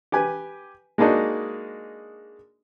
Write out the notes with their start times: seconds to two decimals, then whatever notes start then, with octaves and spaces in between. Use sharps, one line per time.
0.12 G4 B4 G#5
0.98 G#3 A#3 D4 D#4 F#4